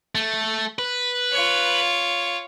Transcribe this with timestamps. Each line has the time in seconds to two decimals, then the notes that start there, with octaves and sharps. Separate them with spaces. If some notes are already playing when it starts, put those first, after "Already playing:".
0.15 A3
0.79 B4
1.32 F4 C#5